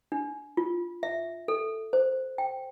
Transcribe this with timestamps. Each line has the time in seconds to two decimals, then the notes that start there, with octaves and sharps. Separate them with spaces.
0.12 D4
0.57 F4
1.03 E5
1.48 A4
1.93 C5
2.38 G5